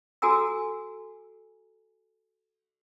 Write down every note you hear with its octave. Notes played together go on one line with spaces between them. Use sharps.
F#4 A4 G#5 A#5 E6